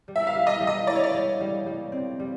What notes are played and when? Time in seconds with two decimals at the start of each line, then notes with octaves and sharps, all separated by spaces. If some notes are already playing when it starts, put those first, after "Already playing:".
0.08 G3
0.16 E5
0.27 F5
0.34 G3
0.47 D#5
0.60 G3
0.67 D#5
0.87 E4 D5
0.95 C#5
1.04 D5
1.14 G3
1.40 G3
1.66 G3
1.92 C4
2.20 G3